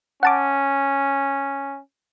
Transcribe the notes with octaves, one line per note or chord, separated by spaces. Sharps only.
C#4 F#5 A5 D6